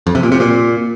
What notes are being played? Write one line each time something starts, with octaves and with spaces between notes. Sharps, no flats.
F2
C3
A#2
C3
A#2